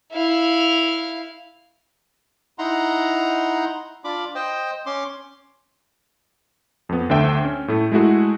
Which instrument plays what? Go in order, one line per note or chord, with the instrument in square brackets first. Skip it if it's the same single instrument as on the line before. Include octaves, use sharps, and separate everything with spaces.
[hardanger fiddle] E4 F5
[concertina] D#4 E4 F#5 A#5 C6
D4 F4 B5 D6
C5 D#5 G5
C#4 C6 D6
[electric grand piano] F2 B3
D2 D3 D4 C5 E5 G5
C#4
A2 A3
G#3 A3 E4 F#4 G#4